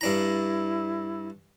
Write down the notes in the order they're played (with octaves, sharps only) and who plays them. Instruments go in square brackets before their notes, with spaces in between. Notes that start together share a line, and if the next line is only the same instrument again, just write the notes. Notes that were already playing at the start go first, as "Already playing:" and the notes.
[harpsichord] G2 D4 A#5 [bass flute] E4